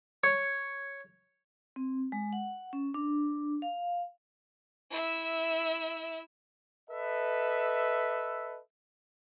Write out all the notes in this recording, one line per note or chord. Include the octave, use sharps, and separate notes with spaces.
C#5
C4
G#3
F#5
C#4
D4
F5
E4 E5
A4 B4 D#5 E5